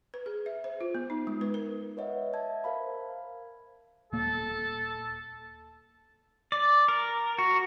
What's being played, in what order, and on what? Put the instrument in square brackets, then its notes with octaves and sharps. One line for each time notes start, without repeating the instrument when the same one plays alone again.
[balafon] B4
G#4
E5
C5
F4
B3
D#4
G#3
B4
A#4
[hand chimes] B4 C#5 D#5 E5 F#5
E5 A5 G#6
A#4 C5 F5 B5
[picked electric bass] D#1 A#3 [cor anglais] A4
[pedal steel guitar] D5
A#4
F#4